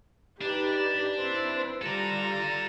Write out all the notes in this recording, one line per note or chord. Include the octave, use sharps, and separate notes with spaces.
D4 D#4 G4 B4 D5
C4 E4 B4 C5
G3 F4 A4 D5 A#5